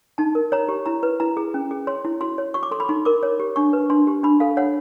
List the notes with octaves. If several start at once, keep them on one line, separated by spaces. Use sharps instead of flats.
D#4 A5
A#4
C#5 A#5
G4
E4 A#5
B4
E4 A#5
G#4
C#4
G#4
C#5 C6
E4
F#4 C6
C#5
F#4 C#6
D6
A4 C6
B5
D#4 C6
A#4 D6
C#5
G4
D4 C#6
B4
D4 C6
G4
D4 B5
A4 F5
C#5 F#5